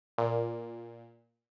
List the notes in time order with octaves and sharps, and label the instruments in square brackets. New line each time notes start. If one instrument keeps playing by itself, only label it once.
[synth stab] A#2